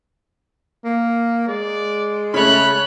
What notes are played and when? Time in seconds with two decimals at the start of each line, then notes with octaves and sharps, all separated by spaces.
0.85 A#3
1.48 G#3 D5
2.34 C#3 A3 C#5 B5 F#6